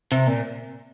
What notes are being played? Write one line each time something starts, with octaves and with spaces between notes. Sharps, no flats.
C3
A#2